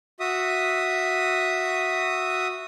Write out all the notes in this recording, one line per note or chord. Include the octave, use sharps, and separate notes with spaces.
F#4 E5 D#6